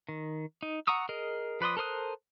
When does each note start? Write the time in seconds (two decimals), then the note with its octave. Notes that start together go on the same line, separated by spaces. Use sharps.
0.09 D#3
0.63 D#4
0.87 F#5 A#5 C#6 D#6 E6
1.09 G#4 A#4 D#5
1.61 F3 B4 D5 C6 D#6
1.77 A4 A#4 C5 D#6 F#6